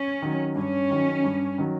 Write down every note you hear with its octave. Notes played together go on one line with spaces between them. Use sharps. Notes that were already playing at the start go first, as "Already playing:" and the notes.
Already playing: C#4
D#3 F#3
G2 C#4
D#3 F#3
G2
D#3 F#3